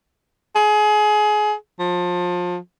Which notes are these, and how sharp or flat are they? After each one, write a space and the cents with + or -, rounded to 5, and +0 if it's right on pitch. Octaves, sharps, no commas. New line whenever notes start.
G#4 +25
F3 +30